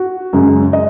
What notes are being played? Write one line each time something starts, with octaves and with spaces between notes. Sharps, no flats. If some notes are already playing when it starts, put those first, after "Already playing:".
Already playing: F#4
F#2 C#3 G#3
D#5